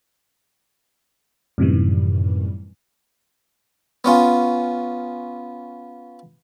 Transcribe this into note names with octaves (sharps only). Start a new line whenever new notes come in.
F#2 A2 C3 D#3 E3 G3
B3 C#4 F4